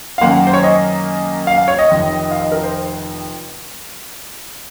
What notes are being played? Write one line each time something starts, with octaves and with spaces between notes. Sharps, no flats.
F5
F#2 D#3 A#3 F#5
C5
C#5
D#5
F5
F5
C#5
D#5
F1 F2 D#3
F5
D#5
A#4
C5